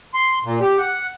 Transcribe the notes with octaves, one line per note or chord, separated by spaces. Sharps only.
C6
A#2
G4
F#5